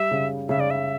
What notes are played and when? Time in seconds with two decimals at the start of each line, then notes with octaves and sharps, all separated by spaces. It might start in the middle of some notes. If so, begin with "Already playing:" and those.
Already playing: G3 E5
0.11 C#3
0.49 C#3 E5
0.60 D5
0.70 E5